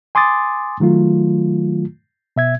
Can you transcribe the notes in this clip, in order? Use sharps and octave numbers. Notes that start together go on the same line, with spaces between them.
G#5 C6 D6 D#6 A6
D#3 F#3 A3 F4
B2 E5 G#6